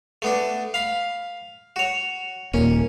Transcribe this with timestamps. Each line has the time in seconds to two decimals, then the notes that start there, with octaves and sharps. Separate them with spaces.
0.22 A3 B3 D4
0.74 F5 B5
1.76 F#4 C#5
2.54 D#1 A#3 C#4